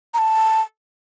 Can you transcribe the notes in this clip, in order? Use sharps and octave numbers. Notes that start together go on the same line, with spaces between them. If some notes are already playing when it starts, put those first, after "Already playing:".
A#5
A5